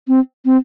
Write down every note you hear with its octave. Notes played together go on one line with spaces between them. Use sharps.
C4
C4